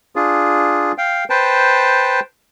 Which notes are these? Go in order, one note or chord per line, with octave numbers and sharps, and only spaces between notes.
D4 F4 G#4
F5 G5
B4 C5 G5 A5